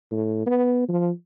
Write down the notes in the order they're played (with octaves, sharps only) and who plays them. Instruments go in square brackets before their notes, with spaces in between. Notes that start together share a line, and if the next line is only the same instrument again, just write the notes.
[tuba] A2
B3
F3